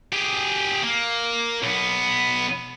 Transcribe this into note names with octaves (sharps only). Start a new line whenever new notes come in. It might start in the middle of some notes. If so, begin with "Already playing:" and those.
G4 G#4
A#3
B1 B3